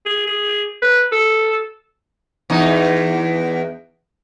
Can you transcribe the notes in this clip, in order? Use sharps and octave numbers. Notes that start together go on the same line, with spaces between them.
G#4
G#4
B4
A4
E2 D#4